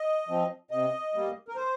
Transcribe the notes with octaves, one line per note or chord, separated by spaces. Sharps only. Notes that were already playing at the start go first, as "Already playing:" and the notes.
Already playing: D#5
F3 C4
C3 D#5
G3 A#3
A#4
C5